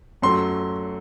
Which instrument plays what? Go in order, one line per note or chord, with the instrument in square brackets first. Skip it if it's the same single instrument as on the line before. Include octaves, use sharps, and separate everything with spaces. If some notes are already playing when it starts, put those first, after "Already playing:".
[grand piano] F#2 F#3 A3 C6